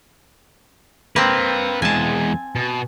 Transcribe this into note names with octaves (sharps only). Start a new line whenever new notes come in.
A#3 C4 B4 G5
E2 G#3 G#5 A5
B2